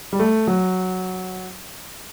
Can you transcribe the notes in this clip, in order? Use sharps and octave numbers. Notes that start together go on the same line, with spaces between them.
G3
A3
F#3